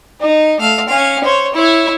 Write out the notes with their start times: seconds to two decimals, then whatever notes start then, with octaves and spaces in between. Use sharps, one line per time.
0.20 D#4
0.60 A3 F5
0.88 C#4 F5
1.24 C5 C#5
1.54 E4 C#5